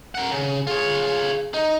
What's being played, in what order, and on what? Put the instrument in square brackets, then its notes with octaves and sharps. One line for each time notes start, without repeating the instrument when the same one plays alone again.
[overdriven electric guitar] A#4 F#5
C#3
[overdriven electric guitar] F4 C#5 [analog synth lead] G#4
[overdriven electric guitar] D#4 [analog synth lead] D#5